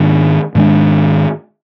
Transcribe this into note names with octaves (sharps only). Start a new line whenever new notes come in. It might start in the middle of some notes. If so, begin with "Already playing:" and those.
Already playing: G#2 D#3 G#3 D4
G#2 D#3 G#3 D4